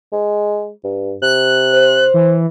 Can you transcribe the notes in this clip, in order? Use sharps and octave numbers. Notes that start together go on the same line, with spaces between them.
G#3
G2
C3 F#6
C5
E3